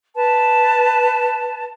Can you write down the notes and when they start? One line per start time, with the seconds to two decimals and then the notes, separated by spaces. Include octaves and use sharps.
0.14 B4 A5